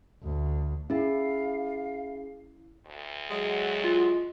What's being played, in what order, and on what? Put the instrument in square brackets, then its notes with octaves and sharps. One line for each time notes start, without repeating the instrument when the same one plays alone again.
[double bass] D2
[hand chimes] C#4 G#4 [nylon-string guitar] E4 [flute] F5
[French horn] D2
[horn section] F#3 G#3
[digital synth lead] F4